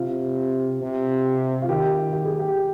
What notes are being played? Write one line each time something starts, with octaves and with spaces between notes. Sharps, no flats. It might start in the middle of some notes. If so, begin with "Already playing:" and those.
Already playing: C3 F4
C3
F4
D#3 G4
G4
G#4
G4